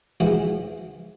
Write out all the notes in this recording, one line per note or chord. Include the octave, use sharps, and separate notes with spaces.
G#2 E3 F3 F#4